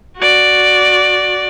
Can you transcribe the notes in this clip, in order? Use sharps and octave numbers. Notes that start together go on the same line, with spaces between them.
F#4 D5